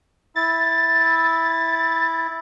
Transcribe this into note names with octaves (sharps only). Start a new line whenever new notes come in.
E4 A6